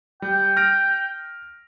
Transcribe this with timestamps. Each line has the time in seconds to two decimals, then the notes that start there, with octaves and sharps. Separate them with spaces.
0.22 G3 G5
0.57 F6 A#6 D7